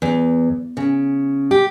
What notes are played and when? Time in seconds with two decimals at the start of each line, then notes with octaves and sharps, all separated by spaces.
0.02 E2
0.77 C#3
1.51 G4